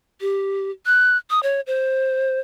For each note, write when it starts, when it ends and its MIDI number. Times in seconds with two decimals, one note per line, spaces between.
0.21 0.71 67
0.86 1.17 90
1.30 1.40 87
1.43 1.61 73
1.67 2.40 72